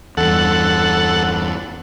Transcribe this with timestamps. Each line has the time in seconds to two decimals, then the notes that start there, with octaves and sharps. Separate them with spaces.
0.17 E2 G2 A4 F#5